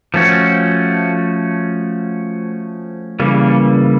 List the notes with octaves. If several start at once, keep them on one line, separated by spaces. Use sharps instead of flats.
F3 A3 C#4 F#4
C#3 E3 G3 A#3